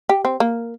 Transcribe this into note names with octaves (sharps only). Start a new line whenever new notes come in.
G4
C4
A#3